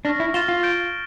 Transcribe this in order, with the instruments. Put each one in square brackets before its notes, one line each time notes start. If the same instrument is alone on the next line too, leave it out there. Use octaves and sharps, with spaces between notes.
[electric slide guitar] D4 [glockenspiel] C#6 F6 A#6
[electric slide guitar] E4
[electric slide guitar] F4 [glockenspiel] F6 A6 E7 G7
[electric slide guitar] F4
[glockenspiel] G6 D7 G7